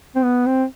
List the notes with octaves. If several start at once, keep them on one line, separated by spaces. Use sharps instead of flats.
C4
B3
C4